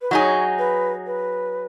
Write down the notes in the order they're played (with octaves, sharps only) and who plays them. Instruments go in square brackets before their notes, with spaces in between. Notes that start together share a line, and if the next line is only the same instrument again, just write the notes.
[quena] B4
[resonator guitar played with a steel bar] F#3 D#4 G#4 [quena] C#5
[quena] B4
B4